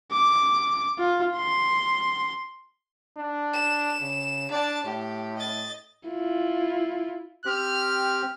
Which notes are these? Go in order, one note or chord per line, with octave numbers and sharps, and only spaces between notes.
D6
F4
C6
D4
E7
C#3
D4 D5 A5
A2 G4
D#5 A6
E4 F4
C4 G4 F6